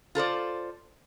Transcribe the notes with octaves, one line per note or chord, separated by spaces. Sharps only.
F4 A4 C5 D5